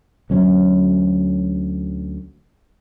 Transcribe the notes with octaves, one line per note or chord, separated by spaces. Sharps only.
D2 F#3 C#4